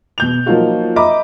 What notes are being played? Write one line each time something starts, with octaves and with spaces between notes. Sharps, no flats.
B2 G6 F7
F3 F#3 A#3 D#4 F4 F#4
D#5 E5 A#5 B5 D6